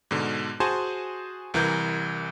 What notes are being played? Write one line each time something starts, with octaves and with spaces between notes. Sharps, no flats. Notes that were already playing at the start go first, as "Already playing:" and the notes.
G#2 B2 D3
F#4 G#4 C5 G#5 A5 C6
C2 E3 A#4 G6